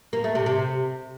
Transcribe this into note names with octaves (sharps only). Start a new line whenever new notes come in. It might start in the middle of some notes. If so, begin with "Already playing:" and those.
A#3
A3
C3
C3